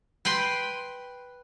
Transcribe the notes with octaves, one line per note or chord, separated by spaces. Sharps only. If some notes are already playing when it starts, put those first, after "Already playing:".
B4 G5 B5 C6